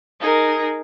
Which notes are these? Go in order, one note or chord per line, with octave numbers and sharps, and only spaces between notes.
D#4 G#4 A#4